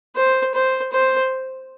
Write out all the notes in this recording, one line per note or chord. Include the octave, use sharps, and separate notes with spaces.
C5
C5
C5